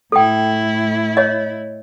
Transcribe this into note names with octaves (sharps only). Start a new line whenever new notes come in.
A2 E4 A4 G5
C#5 D#5